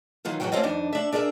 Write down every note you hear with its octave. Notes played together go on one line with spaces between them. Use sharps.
D#3 E3 F#3 F4
E2 A2 D#3 F#3 F#4 G5
A3 A#3 C4 C#4 F4 D#5
F2 D#3 D4 D#5
A3 D4 E5
D4 G#4 A#4 D5 E5